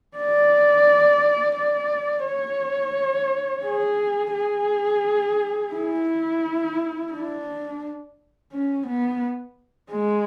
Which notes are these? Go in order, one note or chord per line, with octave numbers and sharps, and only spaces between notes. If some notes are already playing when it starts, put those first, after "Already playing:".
D5
D5
C#5
G#4
G#4
E4
D4
C#4
B3
G#3